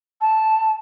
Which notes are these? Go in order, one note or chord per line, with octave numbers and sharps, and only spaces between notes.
A5